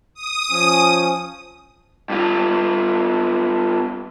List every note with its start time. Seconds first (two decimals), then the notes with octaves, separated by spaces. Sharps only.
0.14 D#6
0.51 F3 C#4
2.10 G2 F4